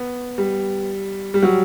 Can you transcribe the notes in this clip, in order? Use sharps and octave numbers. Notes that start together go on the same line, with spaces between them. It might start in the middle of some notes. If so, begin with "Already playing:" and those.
Already playing: B3
G3
G3
F#3